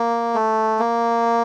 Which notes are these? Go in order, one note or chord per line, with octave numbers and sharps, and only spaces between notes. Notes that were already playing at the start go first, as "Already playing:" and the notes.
Already playing: A#3
A3
A#3